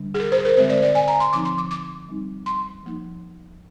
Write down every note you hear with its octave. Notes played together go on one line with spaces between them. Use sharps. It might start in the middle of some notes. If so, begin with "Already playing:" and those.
Already playing: D3 G3 D4
G#4
A#4
C5
A#4
D3 G#3 C4 C5
D5
D5
G#5
A#5
C6
D3 F3 C4 D#4 D6
C6
D6
D6
G3 C4 D#4
C6
F3 A#3 D#4